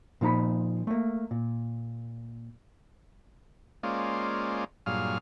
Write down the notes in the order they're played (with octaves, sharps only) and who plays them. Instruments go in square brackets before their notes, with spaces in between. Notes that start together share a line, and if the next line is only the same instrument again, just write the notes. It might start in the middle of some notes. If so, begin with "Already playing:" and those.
[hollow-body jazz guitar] A#2 F3 D#4 A#5 B5
A3 A#3
A#2
[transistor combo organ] G#3 A#3 C#4 F4 C5 D5
G2 A#2 F#3 G#4 F5 F6